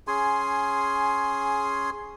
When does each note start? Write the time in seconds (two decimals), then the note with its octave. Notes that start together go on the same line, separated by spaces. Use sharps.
0.07 C#4 G#4 G#5 C6